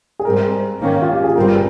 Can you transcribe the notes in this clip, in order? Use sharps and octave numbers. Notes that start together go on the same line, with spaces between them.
G#4
G#2 G3 C4 A#4
G#2 D#3 A#3 C#4
F4
G4
G#4
G1 G2 G3 C4 A#4